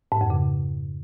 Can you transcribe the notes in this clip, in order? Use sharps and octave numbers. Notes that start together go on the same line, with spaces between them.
G#2
F2
C#3